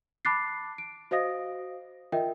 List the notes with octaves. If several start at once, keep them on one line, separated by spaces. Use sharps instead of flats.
A5 B5 D6 F#6 A6 C7
D7
F#4 C5 D#5 F5 D#6 A#6
F4 A#4 D#5 E5 G5